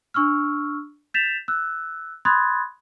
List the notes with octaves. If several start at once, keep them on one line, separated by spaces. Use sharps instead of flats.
D4 C#6 E6 F6
G6 A6 B6 E7 F7
E6 F#6
B5 C6 D#6 F#6 G#6 A6